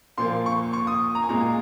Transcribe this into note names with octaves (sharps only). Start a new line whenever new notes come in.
A#2 F3 A#3 C6
C#6
C#6
D#6
A#5
G#5
A#2 G#3 A#5